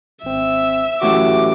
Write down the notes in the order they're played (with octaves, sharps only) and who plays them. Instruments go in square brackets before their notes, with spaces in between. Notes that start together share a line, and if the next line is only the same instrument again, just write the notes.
[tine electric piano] G#1 C4 [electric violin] E5
[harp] F#2 A2 E3 [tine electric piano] F#4 G4 [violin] D6